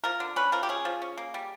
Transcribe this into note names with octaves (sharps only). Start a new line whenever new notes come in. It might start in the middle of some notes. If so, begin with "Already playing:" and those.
F3 A#4
D3
C#4 B4
F3 A#4
G4
C#4 G#4
F3
C#4
A#3
G3